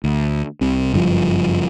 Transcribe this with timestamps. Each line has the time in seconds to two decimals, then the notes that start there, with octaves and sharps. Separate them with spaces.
0.04 D2
0.61 C2 C3
0.93 F#1 G2 B2 F3